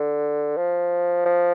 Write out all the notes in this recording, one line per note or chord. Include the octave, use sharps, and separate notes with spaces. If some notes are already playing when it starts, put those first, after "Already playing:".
Already playing: D3
F3
F3